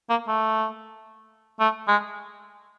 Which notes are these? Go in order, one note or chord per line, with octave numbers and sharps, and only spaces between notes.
A#3
A3
A3
G#3